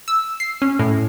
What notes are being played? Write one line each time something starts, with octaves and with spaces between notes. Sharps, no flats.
E6
C7
C#4
A2